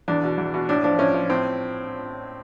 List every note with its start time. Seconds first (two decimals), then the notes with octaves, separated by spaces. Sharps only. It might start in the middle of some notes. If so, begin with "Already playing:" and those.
0.08 E2 D4
0.23 B2
0.38 E2
0.54 B2
0.69 A2 D4
0.84 F3 D4
0.99 A2 C#4
1.14 F3
1.30 A2 C4